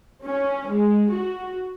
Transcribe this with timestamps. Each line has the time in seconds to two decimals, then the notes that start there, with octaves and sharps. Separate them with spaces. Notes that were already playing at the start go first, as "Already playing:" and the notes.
0.25 C#4
0.69 G#3
1.11 F#4